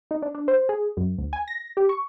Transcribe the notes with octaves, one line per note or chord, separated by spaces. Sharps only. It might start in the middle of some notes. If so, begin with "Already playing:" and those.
D#4
D4
D4
C5
G#4
F#2
D2
G#5
A#6
G4
C#6